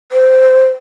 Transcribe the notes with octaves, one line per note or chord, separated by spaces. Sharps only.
C5